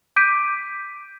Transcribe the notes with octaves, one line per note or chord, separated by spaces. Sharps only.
D6 G6 B6 D7 D#7